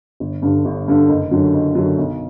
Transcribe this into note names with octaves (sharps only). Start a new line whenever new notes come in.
G1
G2 D3
G1
G2 D3
F#1
F#2 D3 F#3
F#1
F#2 D3 F#3
B1